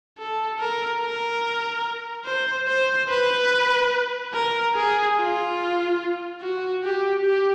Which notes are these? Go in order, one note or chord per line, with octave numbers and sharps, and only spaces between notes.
A4
A#4
A#4
C5
C5
B4
A#4
G#4
F4
F#4
G4
G4